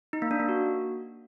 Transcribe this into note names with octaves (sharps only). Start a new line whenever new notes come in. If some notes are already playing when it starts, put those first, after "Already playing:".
D#4
A#3
D4
A#3
F#4